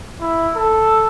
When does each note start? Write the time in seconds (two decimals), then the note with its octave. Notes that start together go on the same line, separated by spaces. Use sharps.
0.21 E4
0.56 A4